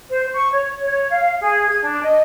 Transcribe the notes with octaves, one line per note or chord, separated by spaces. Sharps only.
C5
C#6
C#5
C#5
F5
G#4
G#6
D4
D#5